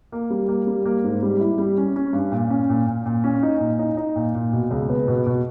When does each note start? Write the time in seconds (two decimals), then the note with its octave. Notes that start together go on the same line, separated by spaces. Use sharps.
0.12 A#3
0.30 G3
0.48 A#3
0.67 G3
0.85 A#3
1.04 G#2
1.23 G3
1.40 E4
1.58 G3
1.78 C#4
1.96 C#4
2.13 G2
2.31 A#2
2.50 C#4
2.69 A#2
2.87 A#2
3.06 A#2
3.24 C#4
3.43 D#4
3.60 A#2
3.79 D#4
3.97 D#4
4.16 A#2
4.35 A#2
4.53 B2
4.71 C#2
4.90 B3
5.08 B2
5.26 B2